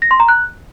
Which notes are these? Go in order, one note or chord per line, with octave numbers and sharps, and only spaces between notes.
A#6
C6
A#5
F#6